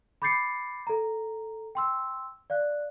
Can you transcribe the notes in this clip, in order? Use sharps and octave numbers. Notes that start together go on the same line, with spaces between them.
B5 D6 G6 A6 C7 C#7
A4 A#5
G5 C6 E6
D5 F5 F#6